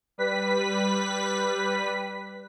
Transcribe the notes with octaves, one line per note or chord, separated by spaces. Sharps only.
G3 B4 B6